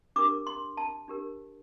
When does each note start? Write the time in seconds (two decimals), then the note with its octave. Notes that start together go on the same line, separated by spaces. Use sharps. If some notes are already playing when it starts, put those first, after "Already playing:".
0.16 D4 G4 A#4 D6
0.47 C6
0.77 A5
1.08 D4 G4 A#4